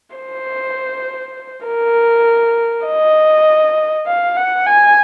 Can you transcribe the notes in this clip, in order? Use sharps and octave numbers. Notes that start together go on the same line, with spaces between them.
C5
A#4
D#5
F5
F#5
G#5